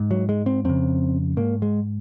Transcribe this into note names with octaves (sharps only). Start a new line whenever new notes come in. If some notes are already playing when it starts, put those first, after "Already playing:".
Already playing: G#2
F#3
G#3
C4
F2 C#3 C4
G#2 A#3
G#3